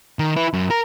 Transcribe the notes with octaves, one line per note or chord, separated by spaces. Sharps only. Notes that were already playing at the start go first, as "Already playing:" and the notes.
D#3
E4 B4
F#2
A#4